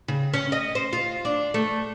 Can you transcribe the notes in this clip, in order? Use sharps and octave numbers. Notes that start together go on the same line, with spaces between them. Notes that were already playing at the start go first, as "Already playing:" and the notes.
C#3
C#4
D#5
C5
F4
D4
A3